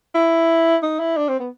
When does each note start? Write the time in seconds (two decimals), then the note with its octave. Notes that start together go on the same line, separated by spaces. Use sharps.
0.15 E4
0.82 D#4
0.99 E4
1.17 D4
1.28 C4
1.39 B3